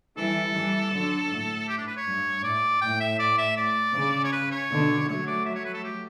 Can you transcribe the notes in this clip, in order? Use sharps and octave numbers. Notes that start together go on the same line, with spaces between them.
E3 G3 A4
E3 G3
D3 F#3
A2
G4
D4
B4
C#5
G2
A2 D5
A2 G5
E5
D5
E5
D5
C#3
C#5
B4
C#5
B2 D3
F#3 A3 C#5
D5
E5
C#5
B4
A4
G4